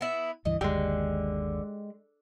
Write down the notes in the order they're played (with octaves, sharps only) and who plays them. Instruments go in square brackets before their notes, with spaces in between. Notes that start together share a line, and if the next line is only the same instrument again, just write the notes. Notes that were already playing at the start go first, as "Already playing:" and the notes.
[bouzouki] B3 E4
[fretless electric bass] C#2 G2 E3 [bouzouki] D#5
[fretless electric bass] G1 D#2 [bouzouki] D3 [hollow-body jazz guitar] G#3 G4